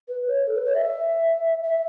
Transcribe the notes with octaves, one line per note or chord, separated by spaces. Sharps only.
B4
C#5
A4
B4
C#5
E5
E5